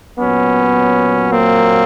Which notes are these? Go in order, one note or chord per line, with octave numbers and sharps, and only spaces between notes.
A#2 F#3 B3 C#4
A#3 C4